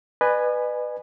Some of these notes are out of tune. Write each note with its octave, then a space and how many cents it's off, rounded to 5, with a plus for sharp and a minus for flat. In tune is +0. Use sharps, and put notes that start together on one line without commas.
B4 +5 D#5 -45 G#5 +0